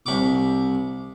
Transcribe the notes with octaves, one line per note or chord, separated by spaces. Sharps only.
C2 B5 C#6 D6